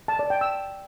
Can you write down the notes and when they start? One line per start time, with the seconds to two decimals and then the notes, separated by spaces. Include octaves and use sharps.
0.08 A5
0.19 D5
0.30 G5
0.41 E6